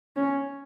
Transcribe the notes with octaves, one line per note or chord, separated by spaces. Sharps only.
C#4